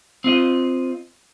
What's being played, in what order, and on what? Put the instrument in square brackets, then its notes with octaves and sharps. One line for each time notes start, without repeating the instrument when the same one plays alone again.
[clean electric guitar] C4 F4 D#5